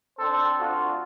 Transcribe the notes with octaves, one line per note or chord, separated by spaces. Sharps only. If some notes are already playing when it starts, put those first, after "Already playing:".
C4 D4 A4 C5
D2 D4 F4 F#4